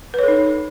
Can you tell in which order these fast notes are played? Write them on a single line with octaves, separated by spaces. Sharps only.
B4 C#5 A4 D#4